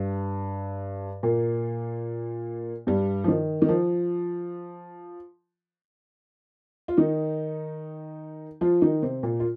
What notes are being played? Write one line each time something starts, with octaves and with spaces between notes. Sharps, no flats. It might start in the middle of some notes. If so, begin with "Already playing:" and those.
Already playing: G2
A#2 A#3
G2 G3
F3
D#3
D#3
F3
F4
D#3 D#4
F3 F4
D#3 D#4
C3 C4
A#2 A#3
F4